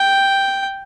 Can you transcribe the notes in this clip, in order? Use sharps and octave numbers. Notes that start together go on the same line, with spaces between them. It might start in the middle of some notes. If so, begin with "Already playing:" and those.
Already playing: G5